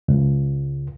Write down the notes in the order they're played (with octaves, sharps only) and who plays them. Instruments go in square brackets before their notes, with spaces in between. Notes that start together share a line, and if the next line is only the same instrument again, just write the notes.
[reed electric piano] C#2